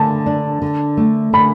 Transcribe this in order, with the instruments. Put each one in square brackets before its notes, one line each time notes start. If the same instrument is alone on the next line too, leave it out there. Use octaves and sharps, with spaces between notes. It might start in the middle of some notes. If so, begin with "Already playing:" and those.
Already playing: [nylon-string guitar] D3 A3 [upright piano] A5
[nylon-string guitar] D4
D3
A3
[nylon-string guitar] D3 [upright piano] B5